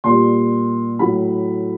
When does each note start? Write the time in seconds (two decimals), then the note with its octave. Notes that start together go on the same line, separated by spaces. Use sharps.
0.04 A#2 G3 C6
0.99 A2 F#3 B5